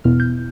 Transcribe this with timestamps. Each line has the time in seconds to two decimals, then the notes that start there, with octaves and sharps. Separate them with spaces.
0.04 E2 B2 B3 E4 F6
0.20 G6